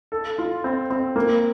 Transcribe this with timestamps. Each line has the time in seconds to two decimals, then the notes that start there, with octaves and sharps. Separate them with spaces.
0.12 A4
0.38 F4
0.64 C4
0.91 C4
1.16 A#3